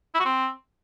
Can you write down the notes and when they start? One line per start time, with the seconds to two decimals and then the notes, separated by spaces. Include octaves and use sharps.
0.14 E4
0.20 F#4
0.25 C4